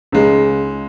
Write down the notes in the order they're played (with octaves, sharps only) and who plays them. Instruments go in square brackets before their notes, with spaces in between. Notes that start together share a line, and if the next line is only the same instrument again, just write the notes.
[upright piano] C#2 C#3 G#3